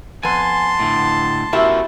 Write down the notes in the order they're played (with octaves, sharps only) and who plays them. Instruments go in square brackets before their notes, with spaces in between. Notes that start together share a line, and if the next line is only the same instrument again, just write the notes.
[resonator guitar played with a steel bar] F2 B3 [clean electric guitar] G#5 [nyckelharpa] A5 C6
[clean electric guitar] A2 D3
[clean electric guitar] B3 F#4 A#4 [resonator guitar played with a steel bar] E4 G4 E5